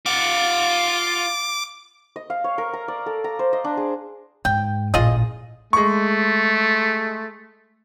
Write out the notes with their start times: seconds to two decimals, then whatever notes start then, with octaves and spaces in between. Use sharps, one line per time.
0.06 F4 F#5 D6
2.16 D#5
2.30 F5
2.44 C#5
2.58 A#4
2.73 A#5
2.88 D5
3.06 A4
3.24 A#5
3.39 C5
3.53 D#5
3.64 D4
3.77 G#4
4.45 G#2 G5
4.94 A1 A#2 F4 G#4 D#5
5.73 G#3 A3 C#6